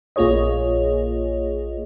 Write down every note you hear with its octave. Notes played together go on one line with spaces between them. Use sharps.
A#1 A#3 F4 G#4 C#5 D#5